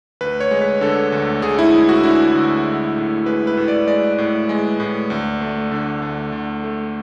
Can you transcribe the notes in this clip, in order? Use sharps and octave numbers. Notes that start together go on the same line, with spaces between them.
D2 B4
C#5
G#3
B4
D3 A4
D2
D2 G#4
E4
G#3
F#4
D3 E4
D2
G#3
A2
G#3 B4
B4
A2
D5
G#3 D5
A2
G#3
A2
D2
A3
D3
D2
D2
A3